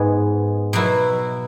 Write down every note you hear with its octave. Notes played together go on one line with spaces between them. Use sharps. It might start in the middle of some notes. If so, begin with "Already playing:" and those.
Already playing: G#2 G#3 B3
B2 F#3 E4